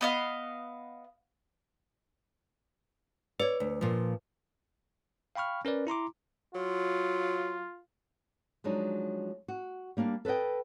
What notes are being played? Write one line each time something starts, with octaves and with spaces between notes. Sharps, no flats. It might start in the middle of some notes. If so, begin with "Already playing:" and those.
B3 D#5 F5
B4 C#5 D5
D2
A#2 F3
F5 G5 B5 C#6 F6
C#4 A#4 B4 D5
E4 A#5 C6 D6
F#3 F4
F3 F#3 G#3 D4 D#4
F#4
G3 A#3 D4 F5
A4 B4 C#5 D#5 G5